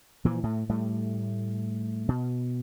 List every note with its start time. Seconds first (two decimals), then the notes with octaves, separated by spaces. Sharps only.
0.25 A#2 E3 F3
0.43 A2 A3
0.69 A2 G3 A3
2.08 B2